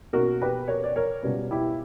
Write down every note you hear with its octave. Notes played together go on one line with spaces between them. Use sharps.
B2 A#3 C#4 F#4 A#4
G4 B4
A#4 C#5
D5
A#4 C#5
C#2 B2 G3 C#4 B4 D5
E4 G4